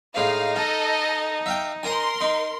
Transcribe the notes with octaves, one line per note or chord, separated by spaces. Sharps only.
A2 G#3 D#4 F5
A4 D#5 F5
E5 F5 G5
A#4 G#5 A#5 C6
D#4